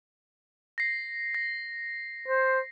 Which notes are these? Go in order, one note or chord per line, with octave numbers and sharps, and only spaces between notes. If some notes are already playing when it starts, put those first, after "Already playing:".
A#6 C7
A#6
C5